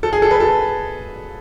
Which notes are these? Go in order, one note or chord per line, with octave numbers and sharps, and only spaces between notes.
A4
G#4
A4
B4
A4